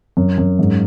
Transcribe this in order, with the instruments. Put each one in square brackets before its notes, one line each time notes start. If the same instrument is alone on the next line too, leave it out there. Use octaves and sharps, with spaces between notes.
[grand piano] F#2
F#2
G#2